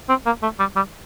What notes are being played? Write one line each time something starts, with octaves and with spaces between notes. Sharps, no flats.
C4
A#3
A3
G3
G3